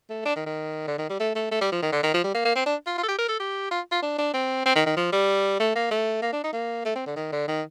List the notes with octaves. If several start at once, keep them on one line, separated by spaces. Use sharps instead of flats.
A3
D4
D#3
D#3
D3
D#3
G3
A3
A3
A3
G3
F3
D#3
D3
D#3
F3
G3
A#3
A#3
C4
D4
F4
F4
A4
G4
A#4
A4
G4
F4
F4
D4
D4
C4
C4
D#3
D#3
F3
G3
A3
A#3
A3
A#3
D4
D#4
A#3
A3
C4
D3
D#3
D3
D#3